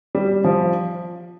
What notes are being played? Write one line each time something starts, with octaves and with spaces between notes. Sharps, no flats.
G3
F3